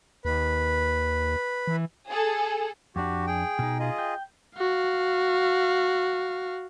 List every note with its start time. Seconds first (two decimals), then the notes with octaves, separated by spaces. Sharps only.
0.25 D#2 B4
1.67 E3
2.10 G#4 A4
2.96 F2 D4 F#4 G4
3.27 G#4 G5
3.59 B2 D#4
3.79 F4 G#4 D#5
3.98 G5
4.58 F#4 F5